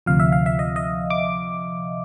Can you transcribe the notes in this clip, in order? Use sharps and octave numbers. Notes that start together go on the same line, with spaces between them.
D2 C3 F3 F5
E5
F5
E5
D#5
D#5
D6